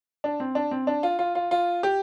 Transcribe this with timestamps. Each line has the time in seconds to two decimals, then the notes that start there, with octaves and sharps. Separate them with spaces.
0.24 D4
0.40 C4
0.55 D4
0.71 C4
0.87 D4
1.03 F4
1.19 F4
1.35 F4
1.51 F4
1.83 G4